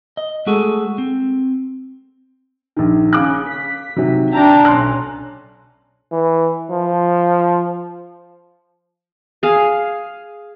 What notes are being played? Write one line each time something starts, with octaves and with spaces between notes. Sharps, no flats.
D#5
G#3 A3 F#4 G#4 A4
C4
A#1 D#3
C#3 F5 D6 F#6
B6
C3 D#3 F#3
D4 E5 G5 A5 A#5
B1 C#4 C6 F#6
E3
F3
G#4 F5